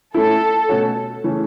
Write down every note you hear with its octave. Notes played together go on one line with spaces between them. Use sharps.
A3 C#4 E4 A4
B2 A3 C#4 F#4 C#5
C#3 E3 A3 C#4